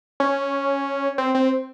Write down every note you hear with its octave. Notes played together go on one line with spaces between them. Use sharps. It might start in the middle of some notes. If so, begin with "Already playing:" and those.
C#4
C4
C4